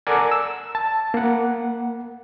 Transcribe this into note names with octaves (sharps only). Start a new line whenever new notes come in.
A4 A#4 D5 F#5 G#5
E6
A5
A#3 F#5